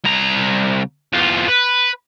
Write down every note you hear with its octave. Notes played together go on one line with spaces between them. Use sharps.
C2 A#5
E2 F4
B4